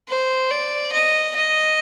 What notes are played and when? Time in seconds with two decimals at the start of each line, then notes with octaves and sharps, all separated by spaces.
0.09 C5
0.50 D5
0.93 D#5
1.36 D#5